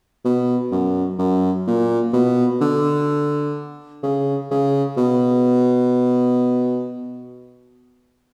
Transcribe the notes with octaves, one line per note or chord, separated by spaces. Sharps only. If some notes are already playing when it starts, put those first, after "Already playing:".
B2
F#2
F#2
A#2
B2
D3
C#3
C#3
B2